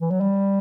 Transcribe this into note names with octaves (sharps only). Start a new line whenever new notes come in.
E3
F#3
G3